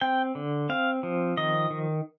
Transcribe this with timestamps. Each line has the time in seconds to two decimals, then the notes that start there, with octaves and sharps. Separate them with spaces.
0.01 C4 G5
0.35 D3
0.69 C4 F5
1.03 F3
1.37 D#3 D#5
1.70 D#3